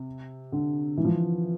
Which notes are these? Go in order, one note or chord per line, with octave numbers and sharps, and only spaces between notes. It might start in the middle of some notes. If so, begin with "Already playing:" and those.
Already playing: C3
D3
E3
F3